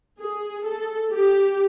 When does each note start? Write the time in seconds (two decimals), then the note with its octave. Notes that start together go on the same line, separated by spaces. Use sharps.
0.21 G#4
0.66 A4
1.13 G4